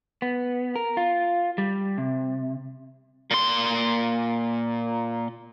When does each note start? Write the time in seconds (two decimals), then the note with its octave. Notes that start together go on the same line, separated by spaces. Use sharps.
0.22 B3
0.76 A#4
0.97 F4
1.58 G3
1.98 C3
3.31 A#2 C6